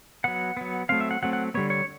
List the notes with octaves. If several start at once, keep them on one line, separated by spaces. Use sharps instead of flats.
F#3 B3 F#5
F#3 B3
F#3 A3 C4 F5
E5
F#5
F#3 A3 C4 F#5
F#5
D3 G3 B3 C#5
C#5